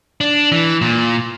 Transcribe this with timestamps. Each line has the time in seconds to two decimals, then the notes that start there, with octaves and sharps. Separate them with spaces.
0.21 D4
0.52 E3
0.82 A#2